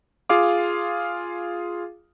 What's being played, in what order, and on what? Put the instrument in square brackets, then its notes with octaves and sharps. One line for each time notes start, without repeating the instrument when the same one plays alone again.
[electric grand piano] F4 G#4 F5 D6